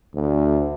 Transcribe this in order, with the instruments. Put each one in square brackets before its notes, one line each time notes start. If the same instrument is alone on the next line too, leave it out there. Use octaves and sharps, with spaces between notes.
[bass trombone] D2